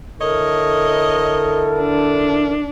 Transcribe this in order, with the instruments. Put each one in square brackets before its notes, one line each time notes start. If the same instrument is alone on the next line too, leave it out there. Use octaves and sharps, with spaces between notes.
[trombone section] D3 E4 A4 [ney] A#4 [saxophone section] C#5 D#5
[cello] D4